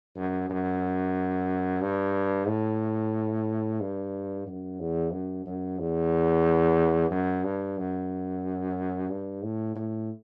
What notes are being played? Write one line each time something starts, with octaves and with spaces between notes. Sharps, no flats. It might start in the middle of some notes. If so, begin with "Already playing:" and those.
F#2
F#2
G2
A2
G2
F#2
E2
F#2
F#2
E2
F#2
G2
F#2
G2
A2
A2